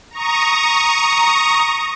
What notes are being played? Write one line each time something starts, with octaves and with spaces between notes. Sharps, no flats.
A#5 C#6 D#6